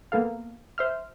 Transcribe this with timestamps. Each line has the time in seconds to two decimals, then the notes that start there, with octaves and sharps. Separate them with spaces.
0.12 A#3 B3 A4 F5
0.78 C5 E5 F6